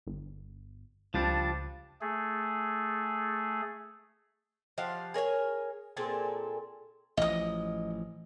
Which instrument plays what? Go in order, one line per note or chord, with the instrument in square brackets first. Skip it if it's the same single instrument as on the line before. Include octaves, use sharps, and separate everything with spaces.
[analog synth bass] G1
[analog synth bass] C#2 [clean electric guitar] F3 G3 D4
[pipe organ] A3 G#4
[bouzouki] F3 G4 F5 F#5
G#4 A#4 C#5 G#5
A#2 C4 G#4 A4
[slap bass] A1 F3 [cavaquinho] D#5 D#6